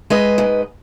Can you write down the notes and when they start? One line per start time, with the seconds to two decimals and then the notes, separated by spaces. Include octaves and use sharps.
0.10 G#3 B4 D#5
0.38 G#2